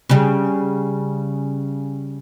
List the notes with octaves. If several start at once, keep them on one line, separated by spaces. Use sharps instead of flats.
C#3 G3